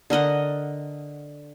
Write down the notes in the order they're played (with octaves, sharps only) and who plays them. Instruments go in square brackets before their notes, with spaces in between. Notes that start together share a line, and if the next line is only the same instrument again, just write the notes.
[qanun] D3 A#4 D#5 F#5